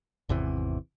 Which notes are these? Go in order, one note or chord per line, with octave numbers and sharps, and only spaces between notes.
G#1 E2 C3 E3